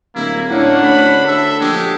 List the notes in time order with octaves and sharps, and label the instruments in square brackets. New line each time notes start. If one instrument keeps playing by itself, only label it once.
[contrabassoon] D1 [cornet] A#3 [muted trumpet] E4
[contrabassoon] A2 [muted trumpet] A#3 [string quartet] C#4 D4 [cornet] F#5
[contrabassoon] D2 [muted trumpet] B5
[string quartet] A4 [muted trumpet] E5
[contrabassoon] A#1 [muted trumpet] G#3 [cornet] G4